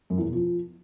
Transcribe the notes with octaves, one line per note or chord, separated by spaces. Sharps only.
F#2
E2
B2
F3